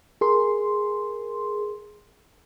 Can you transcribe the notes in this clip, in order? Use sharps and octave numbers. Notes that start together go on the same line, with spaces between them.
G#4 A#4 C6